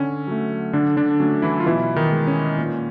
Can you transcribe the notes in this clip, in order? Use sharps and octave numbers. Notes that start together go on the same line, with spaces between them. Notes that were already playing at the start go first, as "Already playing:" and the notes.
Already playing: D3 C#4
F#3 A3
D3 D4
D3 D4
F#3 A3 C#4
E3 E4
F4
B2 E3 E4
D#3 D#4
G#3
C#4
A#2